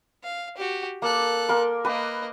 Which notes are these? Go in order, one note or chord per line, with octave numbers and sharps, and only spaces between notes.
F5
F#4 G4
A#3 A4 F#6
A#3 A#4 C6
A#3 B4 D#5 D6